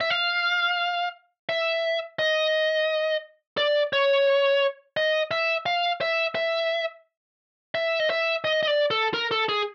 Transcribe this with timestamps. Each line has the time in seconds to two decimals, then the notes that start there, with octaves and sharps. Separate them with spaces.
0.01 E5
0.10 F5
1.49 E5
2.19 D#5
3.57 D5
3.93 C#5
4.97 D#5
5.31 E5
5.66 F5
6.01 E5
6.35 E5
7.75 E5
8.00 D#5
8.10 E5
8.44 D#5
8.63 D#5
8.67 D5
8.91 A4
9.14 A#4
9.31 A4
9.49 G#4